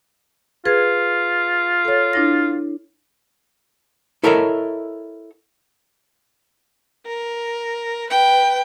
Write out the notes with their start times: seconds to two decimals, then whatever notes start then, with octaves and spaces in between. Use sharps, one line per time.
0.65 F4 G#4 B4 G#6
1.85 A4 C#5
2.13 D4 E4 A#6
4.23 E4 A4 A#4 C#5 D#5 E5
7.07 A#4
8.10 B4 G5